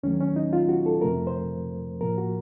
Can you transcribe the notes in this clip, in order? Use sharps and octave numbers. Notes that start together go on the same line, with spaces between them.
D#2 D#3 F#3 A3 C#4
C#4
D#4
F4
F#4
A4
F2 C3 F3 A3 A#4
C5
A2 F3 A#3 A#4
F#4